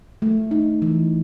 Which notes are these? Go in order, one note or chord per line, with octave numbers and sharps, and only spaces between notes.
A3
D#4
E3